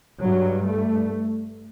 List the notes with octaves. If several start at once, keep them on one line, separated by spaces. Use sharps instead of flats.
G2 F#3
A3